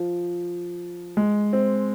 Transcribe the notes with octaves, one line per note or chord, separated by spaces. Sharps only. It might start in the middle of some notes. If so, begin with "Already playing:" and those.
Already playing: F3
G#3
C4